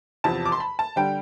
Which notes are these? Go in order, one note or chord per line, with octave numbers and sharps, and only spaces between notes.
E2 C3 F3 A5
D6
C6
B5
A5
D3 G3 G5